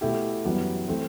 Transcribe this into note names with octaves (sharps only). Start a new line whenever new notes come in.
B2 A3 E4 G4
F#2 E3 G3 B3 F#4
E3 A3 C4 E4